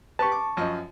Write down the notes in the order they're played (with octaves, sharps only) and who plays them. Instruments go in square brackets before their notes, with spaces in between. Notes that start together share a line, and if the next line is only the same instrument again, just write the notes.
[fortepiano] G4 B4 [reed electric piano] A5 C#6
[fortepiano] D6
F#2 F3 D#5